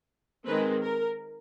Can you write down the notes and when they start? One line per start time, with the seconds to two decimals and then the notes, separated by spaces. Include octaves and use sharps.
0.46 D#3 G#3 C4 B4
0.82 A#4